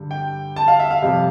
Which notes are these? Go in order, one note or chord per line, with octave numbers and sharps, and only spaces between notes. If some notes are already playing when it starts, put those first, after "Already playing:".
Already playing: G2 D3 G3
G5
A5
F5
E5
F5
F2 C3 G3